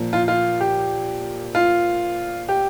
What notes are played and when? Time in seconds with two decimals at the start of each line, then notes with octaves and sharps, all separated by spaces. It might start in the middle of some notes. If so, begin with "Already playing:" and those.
Already playing: A#2 F3 A#3
0.13 F4
0.28 F4
0.60 G4
1.55 F4
2.49 G4